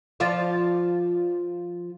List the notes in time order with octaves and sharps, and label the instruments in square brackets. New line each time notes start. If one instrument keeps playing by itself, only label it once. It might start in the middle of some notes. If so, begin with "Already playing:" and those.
[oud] F3 F4 D5